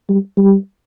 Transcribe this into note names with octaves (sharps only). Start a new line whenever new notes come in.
G3
G3